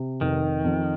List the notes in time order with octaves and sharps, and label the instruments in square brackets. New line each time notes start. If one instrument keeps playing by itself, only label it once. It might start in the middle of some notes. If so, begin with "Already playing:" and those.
Already playing: [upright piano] C3
[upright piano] F1 [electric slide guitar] D#3
[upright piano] F2